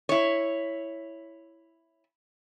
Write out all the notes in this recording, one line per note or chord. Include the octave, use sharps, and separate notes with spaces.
E4 C#5